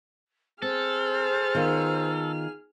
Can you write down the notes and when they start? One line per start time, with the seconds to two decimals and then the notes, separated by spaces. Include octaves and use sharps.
0.62 C4 G#4 A4 C5 F6
1.55 D#3 B3 F4